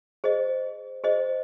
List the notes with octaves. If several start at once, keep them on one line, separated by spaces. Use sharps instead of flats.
G#4 C5 D#5
G#4 C5 D#5